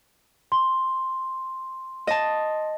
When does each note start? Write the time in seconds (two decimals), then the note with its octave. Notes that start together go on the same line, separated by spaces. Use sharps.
0.52 C6
2.07 D#5 A5